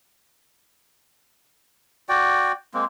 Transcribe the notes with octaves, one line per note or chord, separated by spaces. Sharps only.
F#4 D5 G5
G#3 A#3 C4